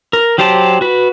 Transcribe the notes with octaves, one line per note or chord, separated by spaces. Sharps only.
A#4
F#3 G4 C5 D5 A5
F#4 B4